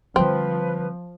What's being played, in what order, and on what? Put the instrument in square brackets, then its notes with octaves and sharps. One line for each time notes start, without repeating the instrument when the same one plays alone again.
[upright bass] D3 G3 [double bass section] F3 [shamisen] C4 [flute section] B4